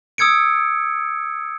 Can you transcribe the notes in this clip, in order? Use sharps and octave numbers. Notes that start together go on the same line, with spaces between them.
D#6 E6 G#6 C#7 D7